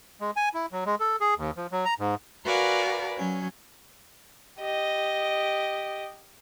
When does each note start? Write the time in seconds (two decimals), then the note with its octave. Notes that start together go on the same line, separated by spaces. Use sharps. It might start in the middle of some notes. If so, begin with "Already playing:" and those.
0.21 G#3
0.36 G#5
0.54 E4
0.72 F#3
0.86 G#3
1.00 A4
1.21 G#4
1.37 D#2
1.57 F3
1.72 F#3
1.85 A#5
1.99 G#2
2.45 F#4 A#4 B4 D5 F5 G#5
3.17 F#3 C#4
4.61 G4 D#5